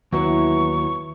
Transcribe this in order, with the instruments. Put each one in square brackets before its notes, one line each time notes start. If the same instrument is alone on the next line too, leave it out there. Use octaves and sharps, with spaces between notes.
[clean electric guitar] D#2 [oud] E3 B3 E4 [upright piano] F#3 [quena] C#6